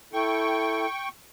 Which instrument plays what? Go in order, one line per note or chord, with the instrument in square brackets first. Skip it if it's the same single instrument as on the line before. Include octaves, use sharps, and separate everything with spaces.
[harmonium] E4 A4 [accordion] G5 C#6